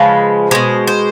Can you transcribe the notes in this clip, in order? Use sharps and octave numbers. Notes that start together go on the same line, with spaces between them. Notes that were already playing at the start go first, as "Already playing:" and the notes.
Already playing: C#3 F3 G#3 B4
B2 G#3 C5
C5